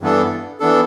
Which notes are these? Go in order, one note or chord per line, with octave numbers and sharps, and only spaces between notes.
G2 E3 B3 D4 A4
E3 B3 D4 A4